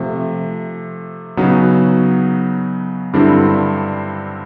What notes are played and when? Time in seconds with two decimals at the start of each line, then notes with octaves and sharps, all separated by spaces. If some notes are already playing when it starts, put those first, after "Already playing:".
Already playing: C3 F3 A3
1.37 C#3 F#3 B3 D#4 F#4
3.13 G2 D3 G3 C4 E4